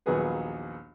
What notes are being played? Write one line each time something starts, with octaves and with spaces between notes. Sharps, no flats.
A#1 D#2 F#3 B3 G#4 B4